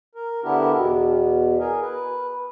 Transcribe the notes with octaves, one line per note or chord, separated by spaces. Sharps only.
A#4
D3 B3 D4 E4 G4 A#4
E2 B2
G#4 A#4
B4